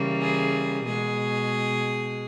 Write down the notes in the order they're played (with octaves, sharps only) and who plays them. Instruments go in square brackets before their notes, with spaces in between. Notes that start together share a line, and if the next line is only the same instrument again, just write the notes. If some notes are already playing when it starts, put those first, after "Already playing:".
Already playing: [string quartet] C#3 E3 G3 A#3
G#4
B2 G#3 G#4